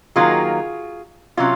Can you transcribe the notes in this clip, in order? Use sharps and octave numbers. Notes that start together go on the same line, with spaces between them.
D#3 F#3 A#3 F4 G#4
C3 F#3 C#4 F4